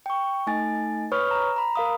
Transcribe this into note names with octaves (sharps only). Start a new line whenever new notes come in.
G5 C#6
A3 D#4 G#5 A6
B4 C#5 B5 C#6 D#6 F6
A#5
A#5 B5
A#4 F5 D#6